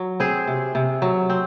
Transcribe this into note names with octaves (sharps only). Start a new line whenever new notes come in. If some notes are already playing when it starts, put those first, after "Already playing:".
Already playing: F#3
C4 G#4 C5
C3
C3
F#3
C4